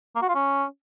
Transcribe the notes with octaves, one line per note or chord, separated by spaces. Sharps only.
A#3
F#4
F4
C#4